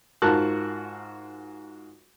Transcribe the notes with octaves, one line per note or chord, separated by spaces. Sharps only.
G#2 F4 F#4 A#4 A5 F#6